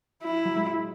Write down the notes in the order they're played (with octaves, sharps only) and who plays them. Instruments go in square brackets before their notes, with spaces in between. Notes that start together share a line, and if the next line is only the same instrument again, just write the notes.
[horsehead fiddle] E4
[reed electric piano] F#3
G#3